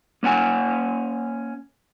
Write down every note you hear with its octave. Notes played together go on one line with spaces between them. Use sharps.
A#3 C#4 F#5 G#5